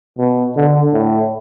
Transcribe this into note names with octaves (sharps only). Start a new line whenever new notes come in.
B2
D3
A2